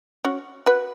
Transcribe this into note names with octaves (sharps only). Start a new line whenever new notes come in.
C#4 F#4
F#4 B4